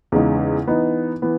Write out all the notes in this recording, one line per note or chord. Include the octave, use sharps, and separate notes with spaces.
E2 C#3 G#3 D#4
E3 B3 D#4
E3 B3